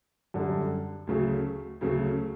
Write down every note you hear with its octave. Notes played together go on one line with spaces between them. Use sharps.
F#2 D3 G3
D2 C#3 F#3 A3
D2 C#3 F#3 A3